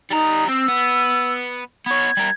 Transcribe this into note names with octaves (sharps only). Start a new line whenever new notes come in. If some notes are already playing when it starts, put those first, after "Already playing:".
G3 D#4 A#5
C4 E6
B3
B3 C#5 G#6
G3 A#4